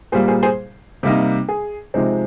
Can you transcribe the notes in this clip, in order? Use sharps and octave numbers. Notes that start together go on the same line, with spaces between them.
A#2 G3 A#3 G#4 C5
G#4 C5
G#4 C5
C3 G3 A#3 D#4
G#4
C3 F3 G#3 C4 D#4